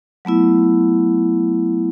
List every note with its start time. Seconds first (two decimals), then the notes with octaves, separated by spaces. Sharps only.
0.25 F#3 A3 B3 E4